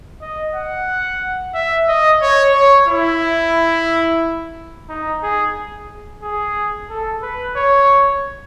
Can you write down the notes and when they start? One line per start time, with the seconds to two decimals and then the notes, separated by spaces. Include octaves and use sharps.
0.21 D#5
0.54 F#5
1.54 E5
1.88 D#5
2.22 C#5
2.55 C#5
2.89 E4
4.89 D#4
5.23 G#4
6.23 G#4
6.90 A4
7.23 B4
7.56 C#5